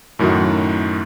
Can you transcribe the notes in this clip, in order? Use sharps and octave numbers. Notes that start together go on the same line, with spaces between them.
F#2 A2 D#3 F#3 F#4